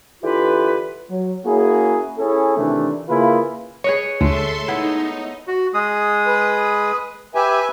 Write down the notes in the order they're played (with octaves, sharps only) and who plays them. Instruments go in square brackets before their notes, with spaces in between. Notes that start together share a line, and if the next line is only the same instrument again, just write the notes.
[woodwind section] D3 E3 F4 G4 B4
[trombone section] F#3
A#3 C#4 E4 F#4 G#4
C#4 E4 G#4 A4
C3 D#3 E3 A3 D4
C#3 A#3 E4 F4 G#4 B4
[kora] G#4 B4 D#5 [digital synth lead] C#5
[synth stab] D2 [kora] G#3 A3 [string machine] A4 E5 C6
[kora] B3 E4 [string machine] D#4
[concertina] F#4
G#3 G#4 D#6
[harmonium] B4
[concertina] G4 [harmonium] B4 E5 G#5